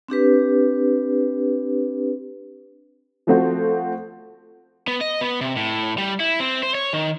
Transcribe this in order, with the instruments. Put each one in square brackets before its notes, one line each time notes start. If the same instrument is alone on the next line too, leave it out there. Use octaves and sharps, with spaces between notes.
[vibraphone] C4 D4 G4 B4
[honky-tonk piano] F3 A3 C4 F#4
[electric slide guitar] B3
D#5
B3
C3
A2
G3
E4
C4
C5
C#5
D#3